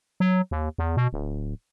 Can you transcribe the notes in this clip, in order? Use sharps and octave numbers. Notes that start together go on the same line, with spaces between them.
F#3
D#2
E2
B2
D1